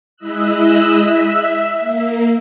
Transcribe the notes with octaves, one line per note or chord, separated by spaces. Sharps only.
G#3 E4 D#5 E5 E6 F#6
E5
A#3